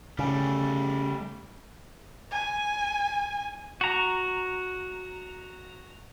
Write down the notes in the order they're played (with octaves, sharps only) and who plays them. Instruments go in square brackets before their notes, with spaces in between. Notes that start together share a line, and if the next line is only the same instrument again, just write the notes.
[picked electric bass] C#3 [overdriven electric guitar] G3 A3
[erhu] G#5
[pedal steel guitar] F#4 A#5